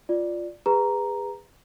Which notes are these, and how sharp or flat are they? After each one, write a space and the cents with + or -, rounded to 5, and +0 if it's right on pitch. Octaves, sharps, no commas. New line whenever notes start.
F4 +0 D5 +5
G#4 -35 B4 +0 A#5 +0